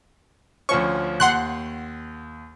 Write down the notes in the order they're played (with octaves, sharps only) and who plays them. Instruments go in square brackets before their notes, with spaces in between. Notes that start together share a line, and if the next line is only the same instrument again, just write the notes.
[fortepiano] D2 F3 C#4 [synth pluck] C#6
[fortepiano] D#2 [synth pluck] F#5 C6 F#6